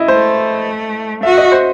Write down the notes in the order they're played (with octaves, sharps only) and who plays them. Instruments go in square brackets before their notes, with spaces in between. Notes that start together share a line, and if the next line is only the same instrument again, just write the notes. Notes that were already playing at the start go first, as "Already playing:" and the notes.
Already playing: [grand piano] E4 D#5
[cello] A3 [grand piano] C5
[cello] F#4 [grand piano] E5
[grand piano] D#5
C5